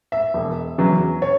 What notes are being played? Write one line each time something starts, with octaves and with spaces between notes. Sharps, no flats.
E5
E1
E2 C#3 F#3
C#5